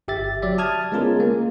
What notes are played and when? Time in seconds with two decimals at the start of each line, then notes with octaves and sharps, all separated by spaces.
0.08 G1 G4 E5 A6
0.42 F#3 D5 E5
0.58 A5 D#6 F6 G#6
0.92 G#3 B3 C#4 F4 G#4 A#4
1.20 A#3